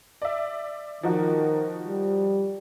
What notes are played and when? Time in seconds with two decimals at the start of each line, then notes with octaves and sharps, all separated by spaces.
0.22 D5 E5
1.03 D#3 F3 D#4 F#4
1.86 G3